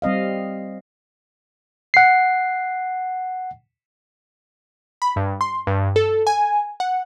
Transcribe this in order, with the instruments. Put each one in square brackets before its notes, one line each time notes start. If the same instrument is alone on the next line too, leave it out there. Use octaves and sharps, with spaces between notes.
[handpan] G3 C4 D#5 F5
[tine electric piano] F#5 C7
[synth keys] B5
G2
C6
G2
A4
G#5
F#5